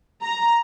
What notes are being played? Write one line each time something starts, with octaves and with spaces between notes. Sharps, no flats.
A#5